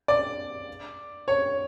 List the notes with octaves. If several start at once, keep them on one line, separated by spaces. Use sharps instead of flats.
D5
C#5